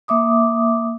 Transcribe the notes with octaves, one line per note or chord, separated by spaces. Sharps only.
A#3 E5 D6 D#6